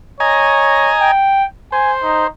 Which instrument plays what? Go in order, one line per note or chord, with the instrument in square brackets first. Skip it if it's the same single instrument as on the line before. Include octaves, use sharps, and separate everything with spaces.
[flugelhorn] C#5 [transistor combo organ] D#5 G#5 A#5
[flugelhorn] G5
[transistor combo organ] C5 [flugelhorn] G#5
[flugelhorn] D#4